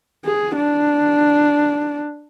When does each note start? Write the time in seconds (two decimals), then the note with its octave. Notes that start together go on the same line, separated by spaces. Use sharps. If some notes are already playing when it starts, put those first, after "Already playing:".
0.25 G#4
0.56 D4